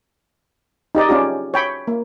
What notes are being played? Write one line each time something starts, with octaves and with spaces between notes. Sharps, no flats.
D#4 G4 D5 D#5
C#4 D4 F4 G4
C#5 G5 B5
A#3